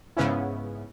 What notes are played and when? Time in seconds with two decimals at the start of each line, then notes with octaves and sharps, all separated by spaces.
0.17 G#2 C#3 B3 C#4 E4